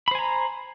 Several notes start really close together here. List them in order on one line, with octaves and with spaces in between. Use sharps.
B5 C5 G#5 A#5